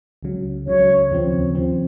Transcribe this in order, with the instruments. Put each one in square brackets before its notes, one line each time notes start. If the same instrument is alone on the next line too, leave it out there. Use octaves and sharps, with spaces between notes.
[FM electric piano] C#2 C#3 F#3
[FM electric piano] C#2 C#3 F#3 [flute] C#5
[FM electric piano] D#2 C#3 F3 C4
D#2 C#3 F3 C4